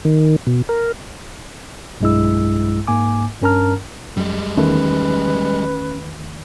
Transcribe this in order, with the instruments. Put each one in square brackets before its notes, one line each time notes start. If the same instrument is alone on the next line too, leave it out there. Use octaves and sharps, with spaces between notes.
[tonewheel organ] D#3
B2
A#4
[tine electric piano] B1 G2 G#3 E4 E6
G#2 A#3 G#5 D6
G2 C#4 A#4 A5 A#5 F6
[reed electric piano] F#2 [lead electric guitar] G3 G#3
[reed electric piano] E2 D#3 A3 [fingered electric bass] C#4 [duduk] B4